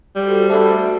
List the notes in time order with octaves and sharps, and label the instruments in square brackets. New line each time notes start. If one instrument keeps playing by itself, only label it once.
[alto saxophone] G3 [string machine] F#4 A4 C5
[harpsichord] A3 D4 E4